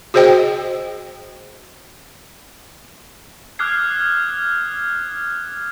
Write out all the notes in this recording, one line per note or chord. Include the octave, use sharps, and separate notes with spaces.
F#4 G#4 C5 D#5 G5
D6 D#6 F6 F#6 G#6 C7